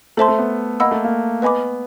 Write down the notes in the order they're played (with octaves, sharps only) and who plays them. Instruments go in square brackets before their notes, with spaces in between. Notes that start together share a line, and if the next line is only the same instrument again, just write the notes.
[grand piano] A3 [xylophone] A4 C5 E5 A5 C6
[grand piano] A3
B3
[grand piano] A#3 [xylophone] D#5 F#5 B5 E6
[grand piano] A3
A#3
[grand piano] B3 [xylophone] B4 D#5 G#5 B5 D6